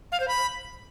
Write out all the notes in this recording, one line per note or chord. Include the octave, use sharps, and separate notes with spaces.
F5
C5
B5